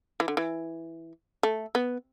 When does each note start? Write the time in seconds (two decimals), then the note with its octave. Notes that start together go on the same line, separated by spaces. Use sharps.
0.20 E3
0.28 D3
0.37 E3
1.43 A3
1.75 B3